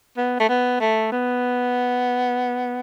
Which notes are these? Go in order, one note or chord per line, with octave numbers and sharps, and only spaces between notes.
B3
A3
B3
A3
B3